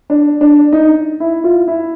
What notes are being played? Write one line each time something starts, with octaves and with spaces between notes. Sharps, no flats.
D4
D4
D#4
E4
F4
E4